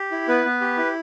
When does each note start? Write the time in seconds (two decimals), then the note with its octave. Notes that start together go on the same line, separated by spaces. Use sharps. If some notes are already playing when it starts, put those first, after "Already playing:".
Already playing: G4
0.12 E4
0.28 B3 B4
0.45 B3
0.61 G4
0.77 E4